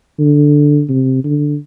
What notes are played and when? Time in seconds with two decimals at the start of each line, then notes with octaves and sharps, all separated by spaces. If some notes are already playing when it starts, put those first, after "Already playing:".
0.19 D3
0.89 C3
1.24 D3